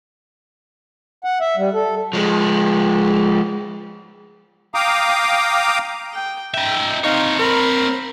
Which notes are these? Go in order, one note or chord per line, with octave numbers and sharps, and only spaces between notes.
F#5
E5
G3
A4
F3 G#3
F5 G5 A#5 D6 D#6
G5
D#4 E5 G5
C4 D#4 C#5 F5
A#4 B5